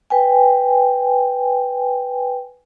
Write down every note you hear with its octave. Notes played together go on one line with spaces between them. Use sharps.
B4 G5 G#5